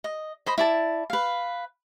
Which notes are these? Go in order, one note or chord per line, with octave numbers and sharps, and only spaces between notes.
D#5
C5 D#5 B5
E4 D5 A5
B4 F5